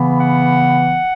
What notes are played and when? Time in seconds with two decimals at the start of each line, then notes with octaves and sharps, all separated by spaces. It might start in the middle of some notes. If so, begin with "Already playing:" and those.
Already playing: C#3 E3 B3
0.19 F#5